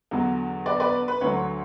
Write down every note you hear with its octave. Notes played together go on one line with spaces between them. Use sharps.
E2 D3 F#3
B4 D5
B4 D5
B4
D2 D3 F#3 C#5